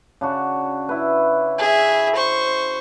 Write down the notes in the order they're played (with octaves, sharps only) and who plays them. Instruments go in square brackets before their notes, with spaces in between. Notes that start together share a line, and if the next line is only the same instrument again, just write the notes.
[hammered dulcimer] C#3 D4 F#4
E4 B4
[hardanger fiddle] G#4 E5
C5 C#6